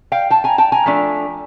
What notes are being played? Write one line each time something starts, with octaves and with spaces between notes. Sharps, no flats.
F5 G5
G5 A5
G#5 A#5
G5 A5
G#5 A#5
F3 A3 D4